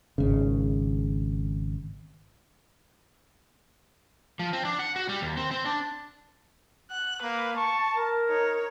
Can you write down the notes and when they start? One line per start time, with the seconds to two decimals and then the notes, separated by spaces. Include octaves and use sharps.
0.18 G#1 C#3
4.39 F3
4.53 C4
4.65 D4
4.79 F#5
4.96 F#4
5.09 G3
5.22 D#2
5.37 C4
5.51 C4
5.66 D4
6.91 F#5 F#6
7.22 A#3 B4
7.56 A5 C#6
7.95 A#4
8.29 D#4 C#5